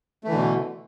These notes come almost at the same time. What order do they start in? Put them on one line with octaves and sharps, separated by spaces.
A3 E3 D3 B2